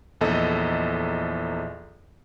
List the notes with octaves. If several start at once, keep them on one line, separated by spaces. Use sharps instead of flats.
A#1 E2 A4 D#5